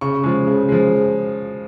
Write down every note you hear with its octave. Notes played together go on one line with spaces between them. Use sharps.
C#3 C#6
F3 G#3
C#3
F3 G#3